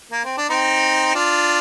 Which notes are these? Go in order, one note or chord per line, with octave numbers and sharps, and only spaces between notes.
A#3
C4
D4
C4 D#4
D4 F4